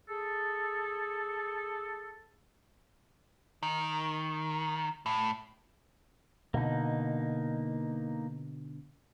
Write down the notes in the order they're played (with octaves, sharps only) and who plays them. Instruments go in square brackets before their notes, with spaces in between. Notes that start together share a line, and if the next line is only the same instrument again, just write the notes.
[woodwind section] G#4 A4
[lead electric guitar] D#3
A2
[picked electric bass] B2 D3 [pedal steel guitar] A#3 D#4